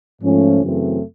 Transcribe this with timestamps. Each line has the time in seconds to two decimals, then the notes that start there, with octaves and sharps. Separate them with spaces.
0.20 G#2 F3 A3 C#4
0.61 F#2 C#3 E3 A3 C4